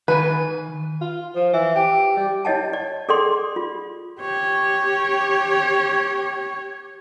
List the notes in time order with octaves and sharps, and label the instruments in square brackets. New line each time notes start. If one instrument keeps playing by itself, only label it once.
[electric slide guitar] D#3 G#5 [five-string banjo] B4
[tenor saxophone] F4
F3
E3
G4
G3
[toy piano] E4 C#5 D#5 G5 A5
D5
G#4 A4 D5 G5 C6
F4
[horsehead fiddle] G4 C#5